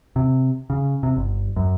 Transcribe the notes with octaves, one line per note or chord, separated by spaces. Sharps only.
C3
C#3
C3
G1
F#2